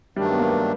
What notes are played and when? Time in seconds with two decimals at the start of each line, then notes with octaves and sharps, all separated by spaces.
0.16 G2 D#3 F#3 G3 A3 D4
0.31 B3
0.39 A#3